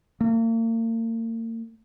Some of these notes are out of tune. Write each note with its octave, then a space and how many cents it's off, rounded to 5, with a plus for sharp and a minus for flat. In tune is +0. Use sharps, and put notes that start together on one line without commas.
A#3 -40